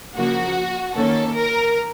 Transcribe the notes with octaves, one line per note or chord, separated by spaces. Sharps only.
C#3 F3 A#3 F#4
D#3 A#3 C#4 A4
A#4